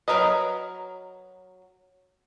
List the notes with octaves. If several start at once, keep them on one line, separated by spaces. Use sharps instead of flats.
F#3 G#4 A#4 B4 D#5